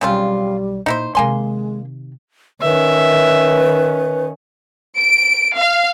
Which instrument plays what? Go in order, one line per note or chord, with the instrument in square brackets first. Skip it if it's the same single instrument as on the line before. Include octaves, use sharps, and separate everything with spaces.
[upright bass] B1 [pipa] C#3 C4 F4 [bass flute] G3
[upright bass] A#2 [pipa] D#4 E4 C5
[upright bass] C3 D#3 [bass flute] G#3 [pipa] A#3 G#5 C6
[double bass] D#3 C#4 [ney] B4 [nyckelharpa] E5
[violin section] D7
F5